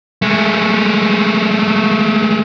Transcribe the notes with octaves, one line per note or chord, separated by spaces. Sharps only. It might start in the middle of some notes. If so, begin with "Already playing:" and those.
G#3 A3